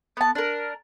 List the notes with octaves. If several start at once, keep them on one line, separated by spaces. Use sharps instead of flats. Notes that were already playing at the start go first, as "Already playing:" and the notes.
B3 A5
D4 A#4